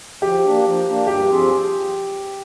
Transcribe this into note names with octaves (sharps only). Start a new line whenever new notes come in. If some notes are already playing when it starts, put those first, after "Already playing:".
F3 G4
A#3 D4
F3
A#3 D4
G2 G4
F3 C4 F4 G#4